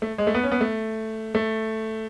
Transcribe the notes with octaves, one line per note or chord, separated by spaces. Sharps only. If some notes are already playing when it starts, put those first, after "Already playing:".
A3
G#3
A3
B3
C#4
B3
A3
A3